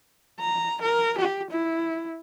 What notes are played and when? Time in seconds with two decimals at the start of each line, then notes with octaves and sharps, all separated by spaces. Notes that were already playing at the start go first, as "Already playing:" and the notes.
0.40 A#5
0.82 A#4
1.18 G4
1.51 E4